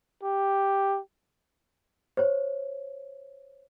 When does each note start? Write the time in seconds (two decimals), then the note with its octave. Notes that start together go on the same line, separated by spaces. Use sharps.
0.24 G4
2.17 C5 C#5